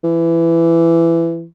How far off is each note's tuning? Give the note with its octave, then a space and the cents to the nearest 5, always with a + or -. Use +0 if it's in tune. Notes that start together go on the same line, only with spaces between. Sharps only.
E3 +15